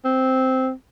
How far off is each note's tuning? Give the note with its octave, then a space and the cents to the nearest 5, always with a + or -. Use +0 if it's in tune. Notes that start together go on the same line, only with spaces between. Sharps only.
C4 -5